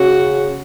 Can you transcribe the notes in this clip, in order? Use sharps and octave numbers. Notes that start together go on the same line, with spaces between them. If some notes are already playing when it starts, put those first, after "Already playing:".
Already playing: C#3 F#4